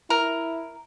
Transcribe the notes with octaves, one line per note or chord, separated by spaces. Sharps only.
E4 A#4